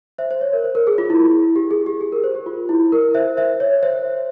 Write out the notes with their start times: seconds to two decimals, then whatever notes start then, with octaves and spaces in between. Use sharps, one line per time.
0.18 C5 E5
0.31 C5
0.41 C#5
0.53 A#4
0.64 C5
0.75 A#4
0.87 G#4
0.98 F4
1.10 E4
1.56 G4
1.71 G#4
1.86 G4
2.01 G#4
2.12 A#4
2.24 C5
2.35 G4
2.46 F4
2.69 E4
2.92 A#4
3.14 C5 E5
3.37 C5 E5
3.60 C#5
3.83 C5 E5